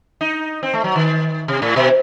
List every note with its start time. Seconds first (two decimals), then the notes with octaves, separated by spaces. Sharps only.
0.21 D#4
0.63 C4
0.74 A3
0.84 F#3
0.96 D#3
1.48 C3
1.62 A2
1.76 B2